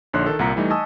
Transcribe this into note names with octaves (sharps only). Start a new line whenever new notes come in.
A#1 D3 D#4 C#5 C6 F#6
D#3 A4
C2 A#2 F#5 A#5 B6 C#7
E3 G3 A3 D#4
D#5 G#5 A5 C#6 D#6 E6